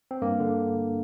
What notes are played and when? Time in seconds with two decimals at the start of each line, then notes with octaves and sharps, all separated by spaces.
0.11 C4
0.22 G2 A#3
0.40 D3